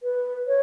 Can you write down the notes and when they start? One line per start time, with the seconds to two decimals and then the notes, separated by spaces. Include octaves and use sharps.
0.03 B4
0.47 C#5